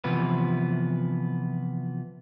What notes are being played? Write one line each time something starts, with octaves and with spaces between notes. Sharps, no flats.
C3 E3 F3 B3 B4